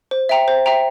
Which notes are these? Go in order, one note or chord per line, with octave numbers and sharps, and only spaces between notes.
C5
E5 G5 A#5
C5
E5 G5 A#5